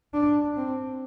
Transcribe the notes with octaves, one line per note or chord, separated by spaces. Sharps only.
D4
C4